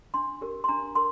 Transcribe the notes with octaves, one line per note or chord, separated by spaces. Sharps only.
D4 C6
G4 A#4
C6
D4 A#5
A#4 C6